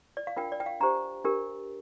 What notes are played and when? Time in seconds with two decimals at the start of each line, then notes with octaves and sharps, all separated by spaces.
0.17 D5
0.27 F5
0.37 D4 F4 A#4 G5
0.52 D5
0.60 G5
0.66 F5
0.80 D4 G4 C5 A#5
1.25 D4 G4 A#4